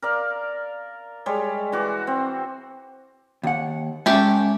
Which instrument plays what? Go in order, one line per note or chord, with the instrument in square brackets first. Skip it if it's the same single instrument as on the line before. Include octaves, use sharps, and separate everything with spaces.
[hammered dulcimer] A#4 D5 F5
G3 G#3 C#5
E3 F#4 D6
C4
[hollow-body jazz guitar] D#2 F#5
[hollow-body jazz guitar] G#3 C#4 [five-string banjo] A3 G4